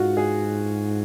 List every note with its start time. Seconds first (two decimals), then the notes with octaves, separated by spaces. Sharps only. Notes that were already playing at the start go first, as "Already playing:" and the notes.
Already playing: G#2 F4 F#4
0.17 G#4